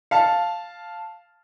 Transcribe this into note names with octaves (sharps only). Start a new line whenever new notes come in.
F5 A5